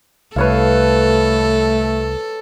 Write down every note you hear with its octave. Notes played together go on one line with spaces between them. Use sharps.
C2 A3 A4 B4 C#5 F5